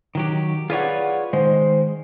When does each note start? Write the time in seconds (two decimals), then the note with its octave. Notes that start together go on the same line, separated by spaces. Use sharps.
0.15 D#3 F#3 G4
0.70 F4 G#4 B4 C#5 D5 F#5
1.33 D#3 G#3 C5